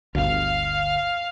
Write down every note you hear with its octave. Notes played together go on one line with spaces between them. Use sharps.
G1 D2 F5